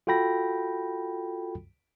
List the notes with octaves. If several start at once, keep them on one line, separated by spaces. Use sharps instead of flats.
F4 F#4 A4 G5 B5 A#6